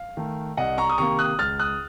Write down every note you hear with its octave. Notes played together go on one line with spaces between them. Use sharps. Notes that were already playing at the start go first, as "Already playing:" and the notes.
Already playing: F5
D#3 A3
C2 D#5 F#5
A#5 C#6
D#6
C3 D#3 A#3 A#5 C#6
D#6 F#6
C#2 F6 A6
D#6 F#6